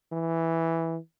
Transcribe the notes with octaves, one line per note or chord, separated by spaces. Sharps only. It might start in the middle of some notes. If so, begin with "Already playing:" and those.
E3